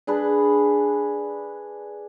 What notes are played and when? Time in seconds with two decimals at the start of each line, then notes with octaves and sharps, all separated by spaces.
0.07 D4 G#4 B4